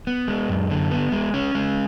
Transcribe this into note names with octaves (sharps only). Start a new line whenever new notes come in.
B3
G#3
F#2
D3
B3
G#3
C#4
G#3